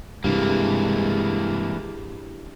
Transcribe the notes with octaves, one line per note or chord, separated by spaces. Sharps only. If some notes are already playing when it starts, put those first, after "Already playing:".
G2 C3 E3 G#3 A#3 D4 E4 G4